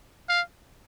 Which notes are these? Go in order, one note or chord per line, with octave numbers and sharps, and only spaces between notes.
F5